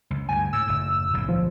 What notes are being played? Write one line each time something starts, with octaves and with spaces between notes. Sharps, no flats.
C#2
D2 G2 G#5
A2 E6
F#1 A2
D1 B1 G#2
F3